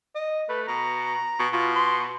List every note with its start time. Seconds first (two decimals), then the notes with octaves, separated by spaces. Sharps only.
0.15 D#5
0.49 A3 B4
0.68 B2 A#5
1.39 B2
1.53 B2 F4
1.76 C6